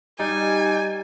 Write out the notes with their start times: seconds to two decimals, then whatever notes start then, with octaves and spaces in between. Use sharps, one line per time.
0.19 G3 D#4 G#5